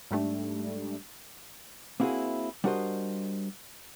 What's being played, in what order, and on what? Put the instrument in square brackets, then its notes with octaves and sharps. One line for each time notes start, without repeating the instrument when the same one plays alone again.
[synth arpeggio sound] G#2 G3 A3 D4
[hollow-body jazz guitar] A#3 C4 E4 F#4 G#4
G3 D4 F#4 A#4 C5 D#5